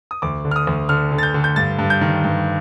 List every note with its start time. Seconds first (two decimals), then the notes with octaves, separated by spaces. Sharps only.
0.11 D#6
0.22 D2 D6
0.45 D3
0.51 F6
0.56 D#6
0.67 D2
0.89 D3 F6
1.12 D3
1.18 A6
1.23 G6
1.34 D3
1.44 G6
1.56 G2 A6
1.79 G2
1.90 G6
2.01 D#3
2.24 G2